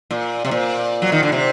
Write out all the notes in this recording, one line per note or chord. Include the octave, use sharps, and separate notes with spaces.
A#2
C3
A#2
F#3
D#3
D3
C3